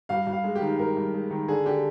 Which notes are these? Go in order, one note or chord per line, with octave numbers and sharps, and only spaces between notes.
G2 F5
G2
F5
G#3
G4
D#3
G2 A#4
G2
G#3
D#3
D3 G#4
D3 G4